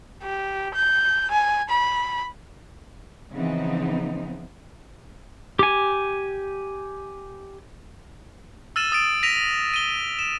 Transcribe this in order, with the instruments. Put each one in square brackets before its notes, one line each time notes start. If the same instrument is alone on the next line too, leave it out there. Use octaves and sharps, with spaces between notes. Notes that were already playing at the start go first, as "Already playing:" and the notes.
[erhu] G4
G6
G#5
B5
[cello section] C#3 E3 F3 B3 C4 D#4
[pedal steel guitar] G4 G#5
[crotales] E6 F6 A6 D#7 E7
D#6 A6 D7
A#6 B6 D#7 F7
D#7 G7
E7